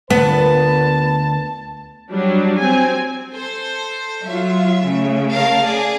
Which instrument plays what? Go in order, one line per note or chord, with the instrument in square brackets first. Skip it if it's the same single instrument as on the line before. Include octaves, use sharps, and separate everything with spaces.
[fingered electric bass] D2 A3 [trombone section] A#2 B4 [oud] B3 [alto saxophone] A5
[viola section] F#3 G3 D4
C4 G#5
[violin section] A4 C5
[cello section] F#3 F4 [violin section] E5
[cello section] C#3 A3
[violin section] A#4 F5 A5
G#4 D5